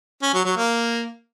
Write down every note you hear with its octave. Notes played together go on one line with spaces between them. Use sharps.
C#4
F#3
F#3
A#3